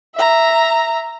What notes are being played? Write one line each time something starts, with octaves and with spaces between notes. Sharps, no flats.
E5 A#5